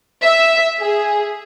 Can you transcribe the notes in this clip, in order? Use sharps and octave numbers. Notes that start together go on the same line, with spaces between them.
E5
G#4